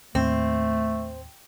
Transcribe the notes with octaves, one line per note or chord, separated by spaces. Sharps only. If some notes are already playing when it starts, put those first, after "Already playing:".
D#2 A2 A3 C4